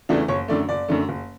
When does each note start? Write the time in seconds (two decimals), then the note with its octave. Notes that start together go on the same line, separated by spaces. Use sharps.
0.09 E2 C#3 E3 A3 D4
0.28 F#1 C#5
0.48 F#2 D3 A3 D5
0.69 F#1 D5
0.88 F#2 D3 A3
1.09 F#1